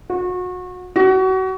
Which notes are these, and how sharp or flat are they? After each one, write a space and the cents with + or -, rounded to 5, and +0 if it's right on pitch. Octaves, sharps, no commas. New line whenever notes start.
F#4 -30
F#4 +30